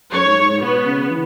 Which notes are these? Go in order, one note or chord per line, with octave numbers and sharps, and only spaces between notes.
F#2 C#5
G#2
G#2
G#2
B2 B3
C#3
C#3
E3